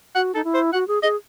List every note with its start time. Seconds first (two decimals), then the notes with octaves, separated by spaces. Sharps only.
0.15 F#4 F#5
0.35 D#4 A4
0.44 E4
0.54 C5
0.73 F#4 F#5
0.88 G#4
1.03 G#4 D#5